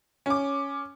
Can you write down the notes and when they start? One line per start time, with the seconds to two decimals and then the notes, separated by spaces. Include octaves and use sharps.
0.26 C#4 D6